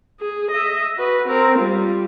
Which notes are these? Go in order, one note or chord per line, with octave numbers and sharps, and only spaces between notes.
G#4
D#5 E5
F#4 B4
C4 A#4
G3 F4